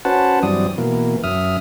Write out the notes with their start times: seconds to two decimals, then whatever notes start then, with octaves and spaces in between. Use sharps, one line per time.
0.05 C#4 F#4 B4 C5 F#5 A5
0.43 G2 E3 F#3 C4 D5 D#6
0.78 B2 E3 A#3
1.24 F#2 E5 D#6 F6